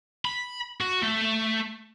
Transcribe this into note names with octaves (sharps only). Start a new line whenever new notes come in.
B5
F#4
A3